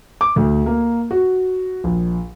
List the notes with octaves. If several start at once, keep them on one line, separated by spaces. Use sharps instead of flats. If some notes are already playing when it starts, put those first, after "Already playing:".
D6
D2
A#3
F#4
A#1